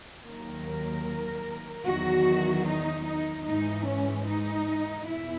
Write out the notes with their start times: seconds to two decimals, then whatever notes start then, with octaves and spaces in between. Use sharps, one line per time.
0.25 D#2 D#3 F#3 A#4
1.85 E2 D#3 F#3 F#4
2.66 D#4
3.05 D#4
3.46 G#2 E3 G#3 D#4
3.87 C#4
4.26 D#4
5.07 E2 B2 E4